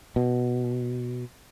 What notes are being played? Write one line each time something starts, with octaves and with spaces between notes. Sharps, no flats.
B2